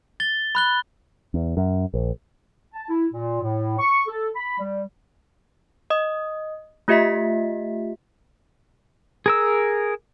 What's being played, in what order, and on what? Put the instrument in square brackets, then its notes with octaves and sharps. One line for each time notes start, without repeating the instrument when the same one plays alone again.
[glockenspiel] A6 G7
B5 F#6 G7
[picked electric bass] E2
F#2
A#1
[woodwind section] A5
E4
A#2
A2
C#6
A4
B5
G3
[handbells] D#5 D#6
A3 F4 G4 D#5 E5 B6
[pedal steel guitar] G#4 A#4 E6